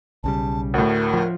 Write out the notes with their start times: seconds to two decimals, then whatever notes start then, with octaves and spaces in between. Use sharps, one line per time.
0.24 B1 C#3 G3 A5
0.74 D2 A2 A#4
1.14 F3